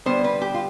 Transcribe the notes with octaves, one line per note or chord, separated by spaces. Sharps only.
D3 G3 B3 C5
B4
G4
F4